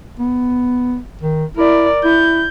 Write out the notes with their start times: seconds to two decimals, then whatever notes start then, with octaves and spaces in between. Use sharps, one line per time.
0.19 B3
1.22 D#3
1.57 E4 A#4 D5
2.05 E4 G6